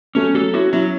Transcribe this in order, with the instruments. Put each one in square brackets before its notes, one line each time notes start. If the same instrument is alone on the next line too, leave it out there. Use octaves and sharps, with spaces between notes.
[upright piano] F#3 A3 [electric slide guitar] C#4
[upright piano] F#3 [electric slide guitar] A4
[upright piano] C#4 E4 [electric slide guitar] F#4
[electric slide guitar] F#3 [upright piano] C#4 E4